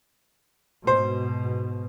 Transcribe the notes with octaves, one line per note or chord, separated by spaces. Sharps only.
G#2 B2 C5